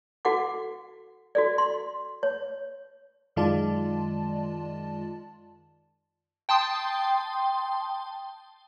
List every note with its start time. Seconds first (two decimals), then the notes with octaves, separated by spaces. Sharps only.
0.25 F#4 A4 F#5 D6
1.35 F#4 A4 D5
1.58 C6
2.23 C#5
3.36 F#2 D#3 G#3 F4 D5 A5
6.49 G5 A5 C6 D#6